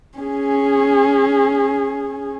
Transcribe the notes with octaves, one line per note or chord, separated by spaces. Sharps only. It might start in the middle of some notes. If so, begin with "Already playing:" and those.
C#4 G#4